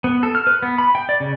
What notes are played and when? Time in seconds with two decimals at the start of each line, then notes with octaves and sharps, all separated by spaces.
0.04 B3
0.23 A4
0.35 F6
0.47 B4
0.62 B3
0.78 B5
0.95 G5
1.09 D5
1.20 C#3